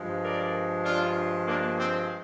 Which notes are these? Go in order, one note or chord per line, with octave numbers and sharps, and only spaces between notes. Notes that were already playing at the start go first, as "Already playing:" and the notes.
Already playing: G2 F3 G#3
A#4 D5
D4 F4
A#3 D4
C4